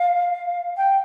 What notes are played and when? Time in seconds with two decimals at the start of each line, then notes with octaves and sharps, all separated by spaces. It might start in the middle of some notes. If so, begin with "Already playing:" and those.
Already playing: F5
0.77 G5